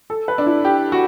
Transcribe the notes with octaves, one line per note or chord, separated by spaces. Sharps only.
A4
B4
D4
E4
G4
F#4